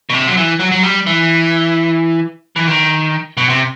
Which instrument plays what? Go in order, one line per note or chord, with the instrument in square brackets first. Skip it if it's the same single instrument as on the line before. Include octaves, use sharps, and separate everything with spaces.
[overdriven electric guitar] B2
C3
F#3
E3
F#3
F#3
G3
E3
E3
D#3
B2
C3